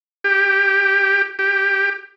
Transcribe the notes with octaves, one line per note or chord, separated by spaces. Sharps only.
G4
G4